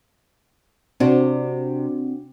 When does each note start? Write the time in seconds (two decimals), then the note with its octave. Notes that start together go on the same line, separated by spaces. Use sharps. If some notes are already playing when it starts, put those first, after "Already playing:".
1.00 C3 C4 D4 F#4